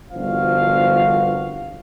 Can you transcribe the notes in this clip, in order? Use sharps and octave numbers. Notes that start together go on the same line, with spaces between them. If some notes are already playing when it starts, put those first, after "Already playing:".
G1 C2 F3 F#4 F5